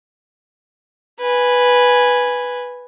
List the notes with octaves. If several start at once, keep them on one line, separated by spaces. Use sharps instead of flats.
B4 G#5